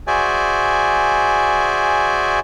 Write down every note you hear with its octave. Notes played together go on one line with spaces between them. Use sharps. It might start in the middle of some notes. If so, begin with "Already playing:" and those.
F#4 G#4 C5 D5 E5 G#5